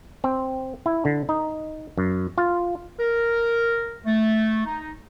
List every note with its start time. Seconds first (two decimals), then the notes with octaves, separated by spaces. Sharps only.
0.24 C4
0.86 E4
1.05 D3
1.29 D#4
1.98 F#2
2.38 F4
2.99 A#4
4.06 A3
4.66 D#4